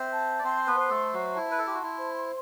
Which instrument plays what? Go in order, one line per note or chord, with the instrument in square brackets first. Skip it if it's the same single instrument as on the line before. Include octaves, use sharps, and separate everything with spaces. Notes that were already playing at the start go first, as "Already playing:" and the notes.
Already playing: [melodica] C4 C5 [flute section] E5
[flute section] A5
[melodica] D5
[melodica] C4 C5 [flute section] C6
[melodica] B3 B4
[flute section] C5
[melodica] B4
A3 A4
[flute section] E5
[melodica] F#3 F#4
[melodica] E4 [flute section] A5
[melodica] B4
A4
[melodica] G4 [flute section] C6
[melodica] F#4
E4
[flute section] C5